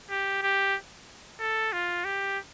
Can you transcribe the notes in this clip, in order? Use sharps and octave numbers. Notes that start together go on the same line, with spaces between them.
G4
G4
A4
F4
G4